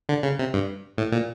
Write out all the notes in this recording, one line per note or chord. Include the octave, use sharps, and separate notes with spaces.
D3
C#3
C3
G2
A2
A#2